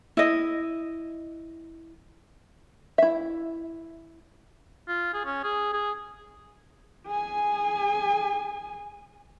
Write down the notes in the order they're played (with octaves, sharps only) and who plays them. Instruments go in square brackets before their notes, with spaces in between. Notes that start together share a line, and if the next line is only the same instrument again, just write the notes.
[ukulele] E4 D#5
[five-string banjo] E4 E5
[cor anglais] F4
G#4
C#4
G#4
G#4
[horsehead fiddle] G#4 G#5